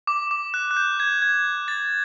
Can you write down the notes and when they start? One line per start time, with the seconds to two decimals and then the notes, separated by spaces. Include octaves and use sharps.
0.07 D6
0.31 D6
0.54 F#6
0.71 F#6
0.77 G6
1.00 G#6
1.22 G#6
1.68 A6